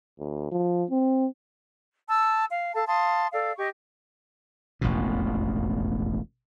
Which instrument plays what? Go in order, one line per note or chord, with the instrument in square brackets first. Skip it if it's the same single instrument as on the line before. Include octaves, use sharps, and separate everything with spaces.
[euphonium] D2
F3
C4
[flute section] A5 E6
F5
A4 F5 A5
F5 A5 C6 D#6
A4 D5 F5
G4 D#5 C#6
[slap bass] E1 A1 F2 B2